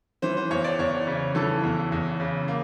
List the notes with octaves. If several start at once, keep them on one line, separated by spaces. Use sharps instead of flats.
E3 C5
C5
E2 C#5
D5
E2 C#5
C#3
E3 A4
E2
E2
C#3
A#3